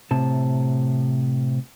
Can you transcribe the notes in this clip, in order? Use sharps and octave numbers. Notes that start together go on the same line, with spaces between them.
A2 C3 A5